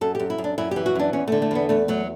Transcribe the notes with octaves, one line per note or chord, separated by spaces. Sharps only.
F#2 A4
F#2 G4
E4
F#2
D4
F#2 E4
G4
E3
F#4
F#2 D4
E2 C#4
D3 A3
A3
E2 B3
E2 A3
F#3 A3